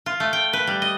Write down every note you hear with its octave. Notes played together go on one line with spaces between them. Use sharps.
F4
A3
G5
B4
G3
D#5